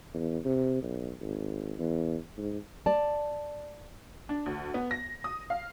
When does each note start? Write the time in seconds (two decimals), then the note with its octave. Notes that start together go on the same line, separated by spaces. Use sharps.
0.14 E2
0.45 C3
0.82 B1
1.21 G#1
1.79 E2
2.37 G#2
2.86 D5 A5
4.29 D4
4.46 D2
4.74 B3
4.91 A#6
5.24 D#6
5.50 F5